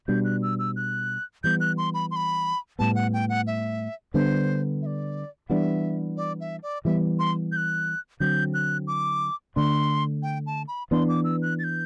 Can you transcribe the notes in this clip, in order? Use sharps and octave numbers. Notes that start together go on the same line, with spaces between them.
B2 G3 D4 G6
F#6
E6
E6
F#6
E3 G3 B3 G6
F#6
C6
B5
C6
B5
A2 G3 B3 A5
F#5
G5
F#5
E5
D3 G3 B3 D4 C5
E5
D5
E3 G3 B3 D4 E5 F#5
D5
E5
D5
E3 G3 B3 E5
C6
G6
F#6
D3 F#3 C4 G6
F#6
D6
D3 A3 D4 C6
G5
A5
B5
E3 B3 D4 C6
D6
E6
F#6
A6
G6